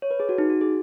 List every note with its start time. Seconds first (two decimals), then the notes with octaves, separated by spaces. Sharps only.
0.02 C#5
0.11 B4
0.20 G#4
0.29 F#4
0.38 D#4
0.50 F#4
0.61 G#4